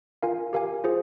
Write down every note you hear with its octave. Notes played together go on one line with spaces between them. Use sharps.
F4 A#4 F5 G#5
G4 A#4 F5 G#5
F4 G#4 C5